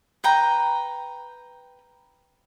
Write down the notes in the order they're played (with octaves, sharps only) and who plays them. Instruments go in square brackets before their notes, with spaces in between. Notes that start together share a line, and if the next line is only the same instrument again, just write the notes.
[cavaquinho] B4 G5 A#5